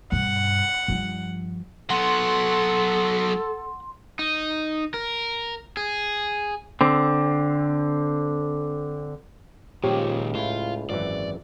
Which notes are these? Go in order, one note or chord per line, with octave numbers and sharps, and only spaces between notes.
G2 B2 F#5
G2 F3
F#3 B3 A4 F#5 C6
D#4
A#4
G#4
D3 C4
C#2 A#2 D#3 F3 G4 C#5
A2 E4 F4
G#1 F#2 E3 D5